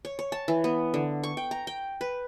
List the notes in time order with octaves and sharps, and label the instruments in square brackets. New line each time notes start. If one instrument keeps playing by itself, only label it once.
[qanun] C#5
C#5
A5
E3
B3
D3
C#6
G5
A#5
G5
B4